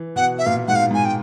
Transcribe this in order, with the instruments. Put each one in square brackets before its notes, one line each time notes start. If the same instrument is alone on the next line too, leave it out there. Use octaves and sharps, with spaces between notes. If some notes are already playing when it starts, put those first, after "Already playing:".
Already playing: [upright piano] E3
[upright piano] B2 [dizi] F#5
[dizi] E5
[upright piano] A#2 [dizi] F5
[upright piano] G#2 [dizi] F#5
[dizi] F5
[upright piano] G#2 [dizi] G#5
[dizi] G5